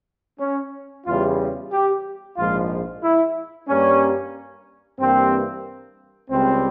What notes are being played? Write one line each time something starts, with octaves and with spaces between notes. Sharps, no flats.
C#4
E2 C#3 G3 F4
G4
A#1 G#2 F3 G#3 F4
E4
G2 G3 A#3 C#4
G2 E3 G3 A#3 C4
C#2 C#3 G3 C4